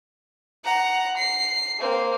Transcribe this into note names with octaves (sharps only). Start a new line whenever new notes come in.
F#5 A#5
C7
A#3 C4